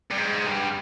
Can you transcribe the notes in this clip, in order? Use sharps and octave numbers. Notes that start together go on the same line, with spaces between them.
G2
G#2
G2